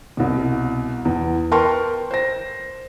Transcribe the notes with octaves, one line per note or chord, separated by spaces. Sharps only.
C2 B2
E2
A#4 B4 G5 A5 C6 C#6
C5 A#6